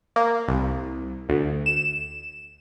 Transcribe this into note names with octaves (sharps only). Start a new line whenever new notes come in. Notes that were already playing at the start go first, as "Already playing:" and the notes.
A#3
C2
D2
E7